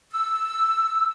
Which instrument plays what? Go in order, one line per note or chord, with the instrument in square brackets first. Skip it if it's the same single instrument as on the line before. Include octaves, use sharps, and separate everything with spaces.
[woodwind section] E6